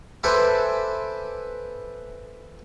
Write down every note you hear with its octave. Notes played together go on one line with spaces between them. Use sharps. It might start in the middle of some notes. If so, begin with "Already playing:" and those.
A4 B4 C5 E5 G#5 D6